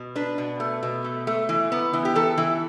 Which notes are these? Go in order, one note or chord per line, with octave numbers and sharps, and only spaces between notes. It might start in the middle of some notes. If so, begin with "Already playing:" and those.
Already playing: B2
D4 B4
B2
A3
B2
A3
A3
E3
B3
E3
G4
E3 A4
E3